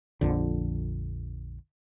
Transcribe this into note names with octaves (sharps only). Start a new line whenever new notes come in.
A#1 F2 D3